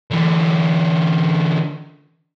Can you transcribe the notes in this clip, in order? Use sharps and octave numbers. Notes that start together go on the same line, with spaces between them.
D3 E3